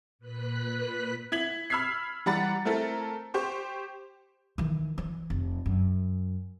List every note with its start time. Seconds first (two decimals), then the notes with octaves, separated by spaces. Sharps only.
0.19 A#2 B4 F#6 B6
1.32 E4 G#6 B6 F#7
1.70 B5 E6 F6 G#6 B6 C7
2.26 E3 G3 F#5 A#5 B5 A6
2.65 A3 C4 E4 A4 A#4
3.34 G4 C5 C#6
4.58 D#3 E3
4.98 E3
5.30 F1
5.66 F#2